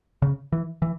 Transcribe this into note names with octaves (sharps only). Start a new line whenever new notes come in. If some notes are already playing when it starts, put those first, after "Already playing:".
C#3
E3
E3